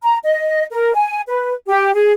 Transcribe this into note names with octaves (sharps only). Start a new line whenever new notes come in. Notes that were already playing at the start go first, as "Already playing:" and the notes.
A#5
D#5
A#4
G#5
B4
G4
G#4